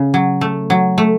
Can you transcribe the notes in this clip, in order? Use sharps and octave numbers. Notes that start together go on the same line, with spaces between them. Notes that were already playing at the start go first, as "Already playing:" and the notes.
Already playing: C#3
F#3
A3
F#3
A3